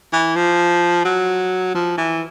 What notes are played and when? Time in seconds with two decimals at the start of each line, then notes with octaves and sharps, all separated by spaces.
0.13 E3
0.36 F3
1.05 F#3
1.74 F3
1.98 E3